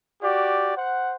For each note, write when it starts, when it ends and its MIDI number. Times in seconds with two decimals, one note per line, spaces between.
0.23 0.76 66
0.23 0.76 67
0.23 0.76 74
0.76 1.16 72
0.76 1.16 78